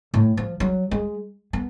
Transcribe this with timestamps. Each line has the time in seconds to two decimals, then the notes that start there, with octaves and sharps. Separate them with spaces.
0.14 A2
0.37 F3
0.60 F#3
0.91 G#3
1.53 B3